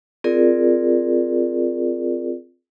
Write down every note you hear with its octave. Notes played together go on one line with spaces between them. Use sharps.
C4 F4 G#4 A#4 D5